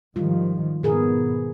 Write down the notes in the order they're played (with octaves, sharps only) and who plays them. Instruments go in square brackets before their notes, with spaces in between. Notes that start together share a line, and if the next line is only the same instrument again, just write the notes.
[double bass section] G#2 D#3 F3 [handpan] G3 F4
[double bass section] G#2 B2 B3 [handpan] D#3 G#4 A#4